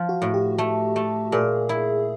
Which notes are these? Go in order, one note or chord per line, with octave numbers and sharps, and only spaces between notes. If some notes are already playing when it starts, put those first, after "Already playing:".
Already playing: F3
F#4
A2
G4
A3
A3
A#2 G#4
E4